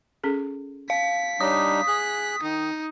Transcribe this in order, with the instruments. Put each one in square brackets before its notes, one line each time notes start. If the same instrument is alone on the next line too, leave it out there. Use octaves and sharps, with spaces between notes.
[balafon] C#4 G#4 A4
[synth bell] F5 [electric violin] B6
[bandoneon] G3 D4 D#4 [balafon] C#5 [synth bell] D#6
[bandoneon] G#4 F#6
[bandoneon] D#3 [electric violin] D#4